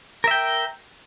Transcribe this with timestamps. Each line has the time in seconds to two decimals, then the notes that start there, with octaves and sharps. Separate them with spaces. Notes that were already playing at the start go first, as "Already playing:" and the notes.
0.24 A#4
0.28 E5
0.31 G5